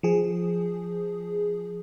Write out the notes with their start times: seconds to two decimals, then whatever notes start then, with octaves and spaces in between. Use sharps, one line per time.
0.03 F3 G#4